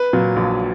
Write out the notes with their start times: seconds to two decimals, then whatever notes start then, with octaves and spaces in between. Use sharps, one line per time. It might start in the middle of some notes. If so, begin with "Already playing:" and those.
Already playing: B4
0.13 A#2 F#3
0.36 A#1